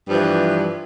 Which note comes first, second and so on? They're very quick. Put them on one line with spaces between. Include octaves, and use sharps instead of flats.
G2 F3 E3